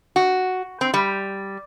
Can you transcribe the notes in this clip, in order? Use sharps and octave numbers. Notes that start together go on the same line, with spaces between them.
F#4
C4
G3